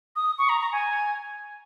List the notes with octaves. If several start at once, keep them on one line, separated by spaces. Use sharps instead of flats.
D#6
C#6
A#5
A#5
G#5